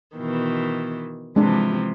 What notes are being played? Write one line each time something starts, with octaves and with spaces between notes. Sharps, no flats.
B2 D#3 E3
C3 E3 F3 G#3 D4